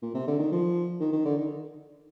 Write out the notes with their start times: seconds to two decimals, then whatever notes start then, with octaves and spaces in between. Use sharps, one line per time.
0.02 A#2
0.14 C3
0.27 D3
0.39 D#3
0.52 F3
1.00 D#3
1.13 D#3
1.25 D3
1.37 D#3